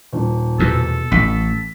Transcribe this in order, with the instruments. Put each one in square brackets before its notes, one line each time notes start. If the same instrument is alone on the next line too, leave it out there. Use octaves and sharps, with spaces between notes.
[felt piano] D#1
[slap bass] E2 B2 [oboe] A4
[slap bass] A1 [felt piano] B6